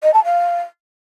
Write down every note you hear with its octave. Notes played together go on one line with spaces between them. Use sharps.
D#5
A5
F5